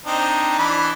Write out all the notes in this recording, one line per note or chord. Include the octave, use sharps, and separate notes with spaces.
C4 D4 D#4
E3 D4 B5